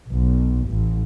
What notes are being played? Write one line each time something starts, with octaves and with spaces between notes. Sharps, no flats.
B1
A1